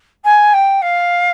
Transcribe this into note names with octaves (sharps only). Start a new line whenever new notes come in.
G#5
G5
F5